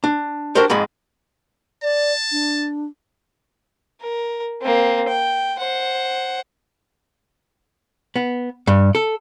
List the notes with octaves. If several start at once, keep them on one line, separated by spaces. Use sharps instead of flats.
D4
D4 F#4 G4 A4 A#4 C5
F2 G#2 G#3 B5
D5 A5
D4
A#4
A#3 C4
G5
C5 F#5
B3
G2
A4